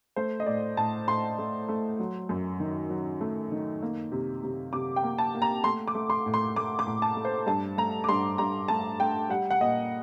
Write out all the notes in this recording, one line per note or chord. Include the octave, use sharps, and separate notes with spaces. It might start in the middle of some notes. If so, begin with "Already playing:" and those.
A3 C5
D#5
A2 D5
A2 A5
A2 C6
A3
A3
F#3
F#2
D#3
F#3
A3
D#3
A#3
C3
C3
C3 D6
G5
A#3
A5
A#3
A#5
A3 C6
D6
A3
C6
A2
C6
A3 D6
D6
A2
A5
A3
C5
G2 A5
A3 A#5
D6
G2 C6
G2 A#5
A3 A5
A3 G5
G3 F#5
F#5
A#2 D#5